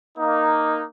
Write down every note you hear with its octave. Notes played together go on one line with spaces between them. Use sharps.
A#3 D#4